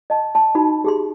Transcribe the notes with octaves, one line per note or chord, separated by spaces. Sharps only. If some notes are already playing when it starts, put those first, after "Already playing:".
D#5 A5
A5 C6
D#4 F#4 B5
G4 G#4 C6